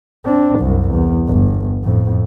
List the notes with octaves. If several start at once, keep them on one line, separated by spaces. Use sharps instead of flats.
C4 D4
C2 F#2
E2
G1
F2 A2